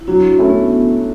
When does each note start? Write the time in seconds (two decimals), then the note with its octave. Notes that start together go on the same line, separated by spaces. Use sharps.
0.01 E4
0.07 F#3 D4 F#4
0.29 D4
0.39 A3 C#4 E4
0.50 B3